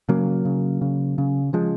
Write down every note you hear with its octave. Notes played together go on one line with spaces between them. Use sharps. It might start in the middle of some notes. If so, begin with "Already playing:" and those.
C#3 F#3 A#3
C#3
C#3
C#3
C#3 F3 G#3